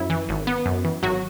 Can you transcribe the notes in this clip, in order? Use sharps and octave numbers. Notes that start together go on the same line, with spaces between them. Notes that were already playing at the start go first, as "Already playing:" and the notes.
Already playing: F#2 E4
E3
G#1
B3
F#2
E3
G#1 F#3 F#4